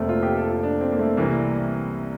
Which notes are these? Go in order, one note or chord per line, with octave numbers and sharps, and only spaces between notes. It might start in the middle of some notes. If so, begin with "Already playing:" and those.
Already playing: F1 A3 A#3 C4
F4
G4
A4
F4
D4
C4
A#3
A3
C2 C3 E3 G3 A#3